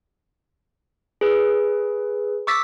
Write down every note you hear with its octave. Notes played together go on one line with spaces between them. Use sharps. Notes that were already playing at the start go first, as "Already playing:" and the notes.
G#4 B4
C#6 D6 E6 A6 B6